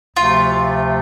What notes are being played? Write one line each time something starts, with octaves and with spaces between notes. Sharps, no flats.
D2 C3 F3 A3 F4